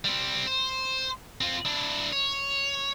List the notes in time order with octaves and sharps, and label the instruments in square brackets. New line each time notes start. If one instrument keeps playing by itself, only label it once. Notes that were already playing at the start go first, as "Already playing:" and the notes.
[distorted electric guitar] G3 C4
C5
C4 F4
D4 E4
C#5